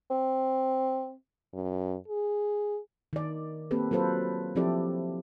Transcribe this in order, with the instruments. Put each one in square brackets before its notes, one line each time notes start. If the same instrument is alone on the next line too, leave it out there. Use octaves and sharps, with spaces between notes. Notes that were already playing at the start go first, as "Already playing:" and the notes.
[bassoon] C4
[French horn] F#2
G#4
[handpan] D#3 D5
A#3 C4 G4 A4 B4
F#3 F4 A4 B4 C5
F3 C4 E4 G4 A4 D5